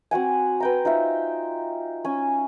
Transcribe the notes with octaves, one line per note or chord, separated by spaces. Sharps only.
C4 F#4 F#5 G#5
B4 G5 A#5
D#4 F4 C5 E5
C#4 G#5